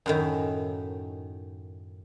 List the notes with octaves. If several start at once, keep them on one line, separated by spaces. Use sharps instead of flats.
F#2 A2 D#3